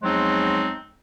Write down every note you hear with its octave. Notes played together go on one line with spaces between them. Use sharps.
E2 F3 F#3 G#3 C4 D#4